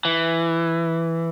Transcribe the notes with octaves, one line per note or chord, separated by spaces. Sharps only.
E3